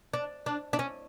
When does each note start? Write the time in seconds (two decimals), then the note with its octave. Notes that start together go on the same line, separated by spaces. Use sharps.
0.14 D4
0.46 D4
0.73 D4
0.79 C#4